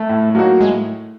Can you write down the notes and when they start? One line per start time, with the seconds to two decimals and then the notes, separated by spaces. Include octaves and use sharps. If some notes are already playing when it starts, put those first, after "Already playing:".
Already playing: A3
0.09 A2
0.35 F#3 A#3 D#4 F#4
0.60 A2 G#3